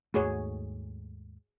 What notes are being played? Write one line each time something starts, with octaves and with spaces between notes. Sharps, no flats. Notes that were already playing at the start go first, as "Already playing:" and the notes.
D#2 G#2 A3 F#4 G#4 C#5